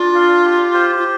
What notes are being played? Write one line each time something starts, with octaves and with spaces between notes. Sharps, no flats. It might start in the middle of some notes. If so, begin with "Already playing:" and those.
Already playing: D4 F4 D5
F5
G4
C5
F4